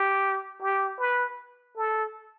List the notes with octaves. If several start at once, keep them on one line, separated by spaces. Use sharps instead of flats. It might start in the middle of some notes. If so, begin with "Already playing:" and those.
Already playing: G4
G4
B4
A4